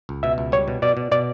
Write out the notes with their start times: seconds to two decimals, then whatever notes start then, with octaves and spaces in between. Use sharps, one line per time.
0.09 C#2
0.23 B2 E5
0.38 C#2
0.52 G3 C#5
0.68 B2
0.82 B2 D5
0.97 B2
1.12 B2 D5